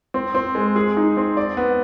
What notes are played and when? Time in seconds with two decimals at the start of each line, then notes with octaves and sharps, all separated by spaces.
0.14 C4
0.35 C4
0.55 G#3
0.76 G#4
0.97 D#4
1.17 C4
1.37 D5
1.57 B3